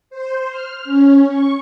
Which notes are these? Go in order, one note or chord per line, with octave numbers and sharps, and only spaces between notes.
C5
F6
C#4
C#6